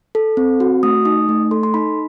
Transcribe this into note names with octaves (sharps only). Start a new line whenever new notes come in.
A4
C4
F#4
A3 D#6
D#4 D#6
A3
A4 C6
C6
D#4 B5